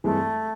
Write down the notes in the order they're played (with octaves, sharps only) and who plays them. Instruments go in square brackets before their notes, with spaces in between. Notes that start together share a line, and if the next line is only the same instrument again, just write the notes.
[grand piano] G2 E3 G#3 C4 [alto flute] A3